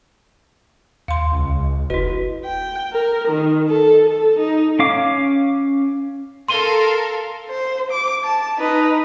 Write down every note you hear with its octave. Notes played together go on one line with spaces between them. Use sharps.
D#2 F5 C6
C#2
F1 E4 F#4 B4 D#5
G5
A#4
D#3
A4
A4
D#4
C#4 F5 D6
A4 A#4 F5 C6 D#7 G7
C5
D6
A5
D#4 B4